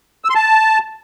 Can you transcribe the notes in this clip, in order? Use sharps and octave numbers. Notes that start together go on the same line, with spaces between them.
E6
C6
A5